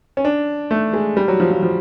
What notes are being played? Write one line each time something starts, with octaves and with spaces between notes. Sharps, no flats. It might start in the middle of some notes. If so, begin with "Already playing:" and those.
C#4
D4
A3
G#3
G3
F#3
F3
F3
F3